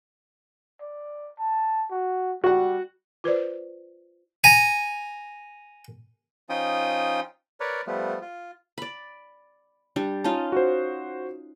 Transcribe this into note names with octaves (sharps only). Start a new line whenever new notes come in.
D5
A5
F#4
G3 F#4 F#5
F4 B4 C5 D5
G#5 A#5
F3 C#4 D#4 F4 G5 D#6
A#4 B4 C#5 D5
F3 G3 A3 B3
F4
D5 B5
G3 D4
C#4 D#4 F4 A5
F#4 C5